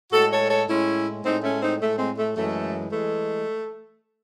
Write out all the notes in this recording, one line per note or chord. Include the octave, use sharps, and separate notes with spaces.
A2 G#3 F#4 A4
A4 C#5
A4 C#5
A2 G#3 C#4 E4
A2 G#3 C4 D#4
A3 C#4
C4 D#4
A2 G#3 A3
G#3 C4
A3
F#2 E3 G#3 A3
E3 G#3 A3